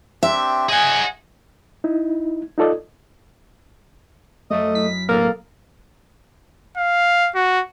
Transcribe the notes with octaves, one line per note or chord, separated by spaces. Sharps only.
C4 D4 G4 E5
G#4 C#5 D#5 F#5 G#5
D#4 E4
D#4 F4 A4 D5 D#5
F#2 A3 D#5
E4 B6
D1 B2 G#3 A#3 A4 A#4
F5
F#4